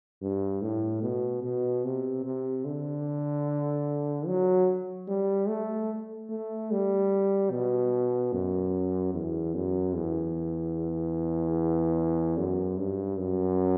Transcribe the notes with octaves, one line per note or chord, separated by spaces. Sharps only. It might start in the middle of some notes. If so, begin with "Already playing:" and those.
G2
A2
B2
B2
C3
C3
D3
F#3
G3
A3
A3
G3
B2
F#2
E2
F#2
E2
F#2
G2
F#2